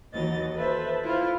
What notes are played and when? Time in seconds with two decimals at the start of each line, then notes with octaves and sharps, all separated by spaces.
0.14 D#2 E3 F#3 D#5 A6
0.55 A4 B4 C5 E5
1.04 E4 F4 C5 F5